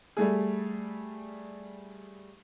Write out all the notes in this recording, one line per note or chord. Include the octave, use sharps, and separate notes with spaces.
G3 A3 G#4